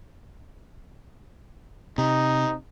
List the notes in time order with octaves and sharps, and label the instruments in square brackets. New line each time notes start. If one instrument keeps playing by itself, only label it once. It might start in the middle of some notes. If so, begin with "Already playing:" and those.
[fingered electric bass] C3 [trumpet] D#4